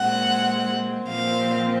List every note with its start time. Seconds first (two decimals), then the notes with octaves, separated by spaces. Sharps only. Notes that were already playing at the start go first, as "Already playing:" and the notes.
Already playing: A#2 G#3 C4 F#5
1.09 A#2 F3 C4 F5